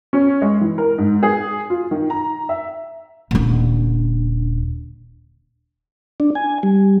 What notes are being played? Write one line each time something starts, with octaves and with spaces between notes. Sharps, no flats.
C#4
G#3
E3
A#4
G#2
G#4
F4
D#3
A#5
E5
D#1 D3
D4
G#5
G3